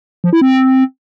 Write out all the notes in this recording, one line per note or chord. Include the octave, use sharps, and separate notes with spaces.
F3
E4
C4